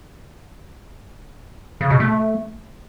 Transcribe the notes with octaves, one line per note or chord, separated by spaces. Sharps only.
C#3
B2
A3